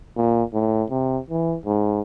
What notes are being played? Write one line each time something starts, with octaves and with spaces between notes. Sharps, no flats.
A#2
A2
C3
E3
G#2